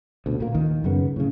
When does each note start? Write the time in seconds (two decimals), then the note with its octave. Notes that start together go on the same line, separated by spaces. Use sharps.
0.26 D2 B2
0.40 A#2 A#3
0.54 D#2 D#3
0.84 F#2 C#3 B3
1.16 A2 C#3